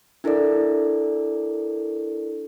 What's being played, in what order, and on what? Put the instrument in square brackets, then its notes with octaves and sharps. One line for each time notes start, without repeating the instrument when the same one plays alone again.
[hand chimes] D4 E4 A4 A#4 D5